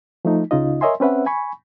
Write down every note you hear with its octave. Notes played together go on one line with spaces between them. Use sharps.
F3 A3 D#4
C#2 C#3 D#4 F4 D#5
A#4 C#5 D#5 E5 G#5 C6
C4 C#4 B4 E5 F#5
G#5 B5 C#6